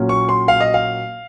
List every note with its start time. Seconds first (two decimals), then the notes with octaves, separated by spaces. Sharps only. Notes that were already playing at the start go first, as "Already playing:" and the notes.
Already playing: A#2 F#3 A#3 C#4
0.09 C#6
0.29 C6
0.48 F5
0.61 D#5
0.74 F5